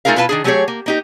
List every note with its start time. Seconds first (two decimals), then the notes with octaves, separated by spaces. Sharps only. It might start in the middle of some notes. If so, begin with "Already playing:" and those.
0.05 A3 D#4 F4 G#4 A#4 F5
0.16 B2 E4 F4 B4 F5 A5
0.29 D#3 D4 G#4
0.44 F#3 A3 B3 G4 G#4 C#5
0.68 A#3
0.86 A#3 D#4 G4